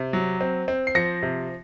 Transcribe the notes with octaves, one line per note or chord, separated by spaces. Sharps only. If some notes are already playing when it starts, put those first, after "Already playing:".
Already playing: C3
F#3
C4
C4
C7
F3 A#6 C#7
C3